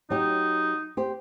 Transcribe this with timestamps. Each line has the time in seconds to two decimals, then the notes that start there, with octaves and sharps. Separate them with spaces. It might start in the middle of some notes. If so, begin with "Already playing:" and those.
0.10 F#3 D#4 G4
0.97 G4 C5